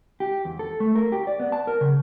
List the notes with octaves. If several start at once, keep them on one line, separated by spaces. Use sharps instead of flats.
G4
E2
A4
A3
A#4
G4
D5
B3
A5
A#4
C#3